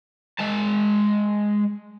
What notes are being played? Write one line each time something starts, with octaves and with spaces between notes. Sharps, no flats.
G#3 A5